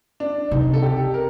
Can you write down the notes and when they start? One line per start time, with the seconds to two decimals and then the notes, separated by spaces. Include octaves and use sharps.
0.20 D4
0.51 C3 D#4
0.73 A4
0.82 G4
1.14 A#4